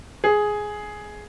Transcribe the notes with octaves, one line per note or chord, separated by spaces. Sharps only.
G#4